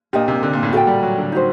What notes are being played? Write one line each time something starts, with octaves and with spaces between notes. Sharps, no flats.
A#2 D4 G4 A#4 D#5
C3
D3
A#2
A2
A#2 F#4 A4 D5 G5
G3
F#3
D3
D#4 F#4 C5